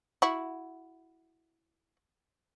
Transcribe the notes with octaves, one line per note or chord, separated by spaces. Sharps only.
E4 F#4